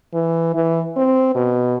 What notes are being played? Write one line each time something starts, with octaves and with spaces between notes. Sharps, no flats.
E3
E3
C4
B2